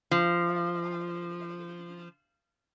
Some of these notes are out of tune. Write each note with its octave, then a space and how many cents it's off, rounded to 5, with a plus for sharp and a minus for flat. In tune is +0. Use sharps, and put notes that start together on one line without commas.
F3 -15